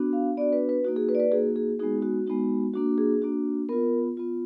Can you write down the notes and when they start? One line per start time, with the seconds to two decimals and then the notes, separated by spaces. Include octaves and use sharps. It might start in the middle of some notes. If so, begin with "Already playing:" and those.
Already playing: B3 D4 F#4
0.13 F5
0.37 B3 D4 F#4 D5
0.53 B4
0.69 B4
0.84 A#3 D#4 F#4
0.96 G#4
1.09 B4
1.15 D5
1.20 B4
1.31 A#3 D#4 F#4 G#4
1.56 G#4
1.79 G#3 B3 D#4 F#4 G#4
2.02 F#4
2.27 G#3 B3 D#4 F#4
2.74 A#3 D4 F#4
2.98 G#4
3.22 A#3 D4 F#4
3.69 B3 F4 A#4
4.17 B3 F4